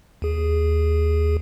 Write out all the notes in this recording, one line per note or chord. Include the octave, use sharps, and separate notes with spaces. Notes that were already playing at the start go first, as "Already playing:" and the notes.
D#2 G#4